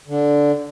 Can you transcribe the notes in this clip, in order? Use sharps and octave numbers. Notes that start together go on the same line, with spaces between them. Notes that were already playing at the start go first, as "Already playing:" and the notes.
D3